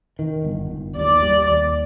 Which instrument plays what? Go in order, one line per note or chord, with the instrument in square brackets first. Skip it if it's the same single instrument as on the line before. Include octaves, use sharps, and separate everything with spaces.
[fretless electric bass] D#3
G1
G1
[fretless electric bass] D#2 [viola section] D5
[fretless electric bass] G3
D#2